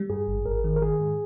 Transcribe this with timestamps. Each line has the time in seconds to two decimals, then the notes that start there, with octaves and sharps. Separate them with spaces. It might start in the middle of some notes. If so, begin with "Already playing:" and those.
Already playing: G3
0.10 G2 G#4
0.27 G#1
0.46 G#1 A#4
0.64 D#3
0.76 A#4
0.82 D#3 G#4
1.00 G#2